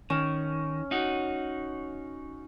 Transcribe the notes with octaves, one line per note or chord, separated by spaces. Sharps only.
D#3 C#4
D#4 F#4